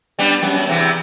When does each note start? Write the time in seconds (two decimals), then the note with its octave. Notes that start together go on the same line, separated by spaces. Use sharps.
0.19 G3 B3 D4
0.42 F#2 G3 B3
0.67 E2 C3 E3